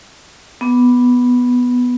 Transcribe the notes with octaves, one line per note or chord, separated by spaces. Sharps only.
B3